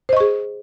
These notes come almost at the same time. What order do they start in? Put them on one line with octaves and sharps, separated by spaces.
C5 D#5 C#6 G#4